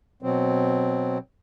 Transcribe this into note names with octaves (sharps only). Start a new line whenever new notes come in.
B2 F#3 C4